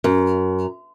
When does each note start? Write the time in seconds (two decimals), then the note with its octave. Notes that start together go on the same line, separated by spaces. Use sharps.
0.04 F#2